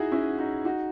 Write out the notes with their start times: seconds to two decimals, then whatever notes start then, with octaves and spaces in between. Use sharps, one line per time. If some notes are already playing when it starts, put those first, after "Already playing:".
Already playing: D#4 E4 F#4 G#4
0.11 C#4 E4
0.38 D#4 F#4
0.65 D#4 F#4